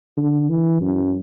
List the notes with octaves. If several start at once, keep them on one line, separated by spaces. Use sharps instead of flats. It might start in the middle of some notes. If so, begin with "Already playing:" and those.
D3
E3
F#2